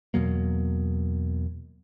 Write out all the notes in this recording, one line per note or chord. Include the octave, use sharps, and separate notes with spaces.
E2 B2 F#3 A#3